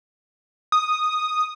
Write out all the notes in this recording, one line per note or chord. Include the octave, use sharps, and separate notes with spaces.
D#6